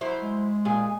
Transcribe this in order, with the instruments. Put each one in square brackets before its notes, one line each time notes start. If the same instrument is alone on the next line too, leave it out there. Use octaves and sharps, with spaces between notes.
[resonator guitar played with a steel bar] F#3 E4 C5
[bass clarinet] G#3
[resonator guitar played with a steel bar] A#2 G#4